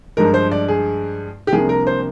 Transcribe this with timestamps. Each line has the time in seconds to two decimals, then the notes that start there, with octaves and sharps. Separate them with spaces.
0.17 G2 F3 G#3 A#4
0.34 C5
0.51 D5
0.68 G#4
1.47 G4
1.52 C2 C3 F3 A#3 D4 G#4
1.69 A#4
1.87 C5